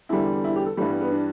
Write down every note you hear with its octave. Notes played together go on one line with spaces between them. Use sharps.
E2 D3 G3 E4
E4
G4
A4
G2 E3 G3 A3
B3
B3
D4